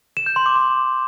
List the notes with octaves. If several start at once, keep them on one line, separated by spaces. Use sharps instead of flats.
E7
G6
C6
D6
C6